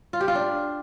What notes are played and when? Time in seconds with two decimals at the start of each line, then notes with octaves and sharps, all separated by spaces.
0.13 F4
0.21 G4
0.28 F4
0.35 D4